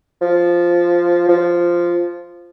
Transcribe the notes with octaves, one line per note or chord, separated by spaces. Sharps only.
F3
F3